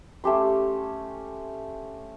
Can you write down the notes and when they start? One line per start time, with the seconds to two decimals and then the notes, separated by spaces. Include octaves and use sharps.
0.24 A3 C#4 G4 C6